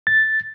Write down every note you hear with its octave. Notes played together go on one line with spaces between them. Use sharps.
A6